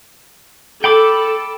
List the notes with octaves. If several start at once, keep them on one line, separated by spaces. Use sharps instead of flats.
A4 G5 B5 D6